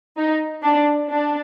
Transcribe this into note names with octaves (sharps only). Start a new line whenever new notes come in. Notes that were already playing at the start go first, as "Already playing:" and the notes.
D#4
D4
D4